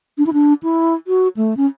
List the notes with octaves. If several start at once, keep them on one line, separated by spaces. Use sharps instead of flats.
D4
E4
D4
E4
F#4
A3
C#4